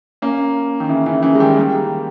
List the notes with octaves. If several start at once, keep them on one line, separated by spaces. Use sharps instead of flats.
A#3 C#4
D#3
C#3 E3
C#3 E3
C#3 E3
G#3
D#3 G3
G3 A#3